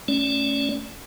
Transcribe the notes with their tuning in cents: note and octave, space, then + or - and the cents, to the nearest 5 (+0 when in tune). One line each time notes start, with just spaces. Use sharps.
A3 +0 C#4 +0 D5 -20